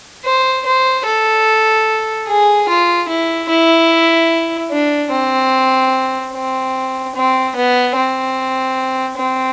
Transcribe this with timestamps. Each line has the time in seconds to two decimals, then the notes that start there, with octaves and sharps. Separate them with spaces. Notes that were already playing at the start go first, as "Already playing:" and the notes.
0.25 C5
0.66 C5
1.06 A4
2.28 G#4
2.68 F4
3.08 E4
3.49 E4
4.71 D4
5.11 C4
6.33 C4
7.15 C4
7.55 B3
7.96 C4
9.17 C4